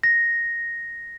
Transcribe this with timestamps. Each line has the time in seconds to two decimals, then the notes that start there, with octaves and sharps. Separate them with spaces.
0.03 A#6